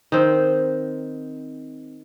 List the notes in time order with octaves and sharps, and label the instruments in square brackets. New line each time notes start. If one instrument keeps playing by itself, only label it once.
[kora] D#3 C4